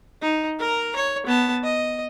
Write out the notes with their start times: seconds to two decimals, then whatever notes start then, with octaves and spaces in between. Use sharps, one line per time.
0.22 D#4
0.59 A#4 A#5
0.96 C#5
1.27 B3 A5
1.64 D#5